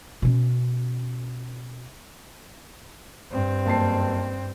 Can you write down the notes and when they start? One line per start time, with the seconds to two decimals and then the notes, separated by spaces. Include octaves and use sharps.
0.22 B2 C#4
3.30 G2 C4
3.66 F#1 A5 C7